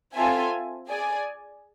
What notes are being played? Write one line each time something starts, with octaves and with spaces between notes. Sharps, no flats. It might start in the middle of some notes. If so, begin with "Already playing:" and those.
C4 F4 A4 E5 G#5
G#4 D5 G#5